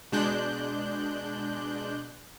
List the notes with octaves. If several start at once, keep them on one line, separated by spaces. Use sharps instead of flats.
B2 G#3 D4 F#6 G6